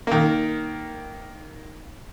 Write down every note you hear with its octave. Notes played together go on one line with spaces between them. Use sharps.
D#3 A#3